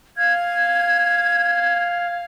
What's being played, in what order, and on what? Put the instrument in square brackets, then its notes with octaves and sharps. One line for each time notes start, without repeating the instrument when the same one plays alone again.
[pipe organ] F5 [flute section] G#6